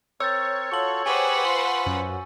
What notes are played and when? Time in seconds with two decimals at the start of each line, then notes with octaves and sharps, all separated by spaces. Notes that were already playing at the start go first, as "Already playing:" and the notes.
0.20 C4 A#4 C5 C#5 E6 G6 A6
0.72 F4 F#4 A4 C#6 F#7
1.06 G4 G#4 B4 C5 F#5 G#5 C#6 D#7
1.44 F4 B5 C6
1.86 F#2